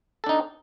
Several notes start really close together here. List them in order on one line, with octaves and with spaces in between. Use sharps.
A4 D4 D#4